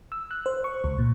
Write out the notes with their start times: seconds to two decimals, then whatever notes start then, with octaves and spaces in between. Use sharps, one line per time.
0.12 E6
0.31 F#6
0.46 C5
0.64 C#6
0.84 C#2
0.99 A#2